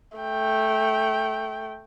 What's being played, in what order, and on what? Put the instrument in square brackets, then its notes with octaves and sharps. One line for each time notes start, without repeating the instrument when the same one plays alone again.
[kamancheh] A3 G5